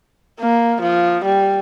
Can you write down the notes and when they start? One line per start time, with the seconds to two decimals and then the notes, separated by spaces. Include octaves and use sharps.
0.40 A#3
0.82 F3
1.25 G3